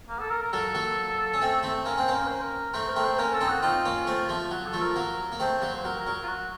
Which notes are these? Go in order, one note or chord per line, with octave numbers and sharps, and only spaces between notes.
A#3
A4
A#4
A#4
F#3 A#3 A4
F#3 A#3
C#4
A3 C4
A3 C4
A#3 C#4 A#4
C4 C5
A#3 C#4
A#4
C5
A#4
A3 C4 C5
A#4
A3 C4
C5
A#3 C#4 A#4
A4
C4 D#4
F#4
C4 D#4 F4
A#3 C#4
A3 C4
F3 A3
F#3 F#4
A4
F3 A3
A#4
F#3 A#3
A#3
A3 C4 C5
F#3 A#3
C5
F#3 A#4
A#4
F#3
F4
F#4